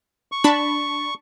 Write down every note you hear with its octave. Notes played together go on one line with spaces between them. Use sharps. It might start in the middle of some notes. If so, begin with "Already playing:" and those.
C#6
D4 A5 B5